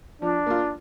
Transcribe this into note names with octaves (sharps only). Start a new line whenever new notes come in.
F3 D4
A#3 F4